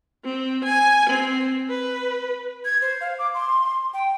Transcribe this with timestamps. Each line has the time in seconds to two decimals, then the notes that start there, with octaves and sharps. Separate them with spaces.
0.24 C4
0.64 G#5
1.09 C4
1.69 B4
2.65 G#6
2.82 C5
3.01 F5
3.19 D6
3.34 C6
3.94 G5